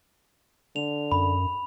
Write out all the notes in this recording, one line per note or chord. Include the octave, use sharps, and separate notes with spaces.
D3 F7
F#2 B5